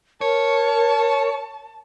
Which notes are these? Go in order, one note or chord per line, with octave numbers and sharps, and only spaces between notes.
A#4 C#5 A5